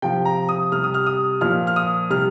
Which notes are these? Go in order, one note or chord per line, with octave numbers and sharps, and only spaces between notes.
C3 F3 G5
A#5
D#6
C3 G3 F6
D#6
F6
D#6
A#2 F3 F6
F6
D#6
C3 G3 F6